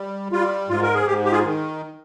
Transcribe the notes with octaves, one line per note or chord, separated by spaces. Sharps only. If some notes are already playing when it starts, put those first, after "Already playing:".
Already playing: G3
G3 F4
G#2 F4
A#4
G#4
G#2 G4
G4
F4 G#4
D#3